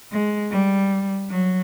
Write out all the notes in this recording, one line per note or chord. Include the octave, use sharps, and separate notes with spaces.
G#3
G3
F#3